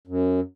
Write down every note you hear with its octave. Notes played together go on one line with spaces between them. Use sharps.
F#2